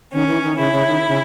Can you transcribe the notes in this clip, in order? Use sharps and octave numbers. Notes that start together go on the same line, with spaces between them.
D#3 C#4
E3
D#3
C#3 E4
C#3
D#3
C#3